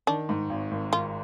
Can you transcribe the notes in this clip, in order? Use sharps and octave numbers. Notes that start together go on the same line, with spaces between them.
D#3 D4
G#2
G#1
G#1
D#3 F4